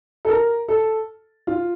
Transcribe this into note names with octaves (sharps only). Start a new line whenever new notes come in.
A4
A#4
A4
F4